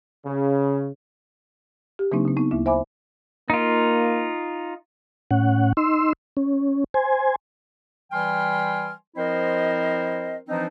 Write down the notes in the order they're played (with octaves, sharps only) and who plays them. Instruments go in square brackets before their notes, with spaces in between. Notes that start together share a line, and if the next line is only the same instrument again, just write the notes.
[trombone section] C#3
[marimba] G4
C#3 F#3 A#3 C4 D4 D#4
C#3 C4
B3 D#4
D2 A#3 E4
C5 E5 G#5 B5 D6
[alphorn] A#3 [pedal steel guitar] D#4 F4
[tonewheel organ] A2 C#4 F#5
D#4 C6 E6
C#4
C5 G#5
[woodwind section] E3 G3 G5 G#5 C6 F6
F3 C4 E4 A#4 C5 D#5
E3 F3 C4 D4 D#4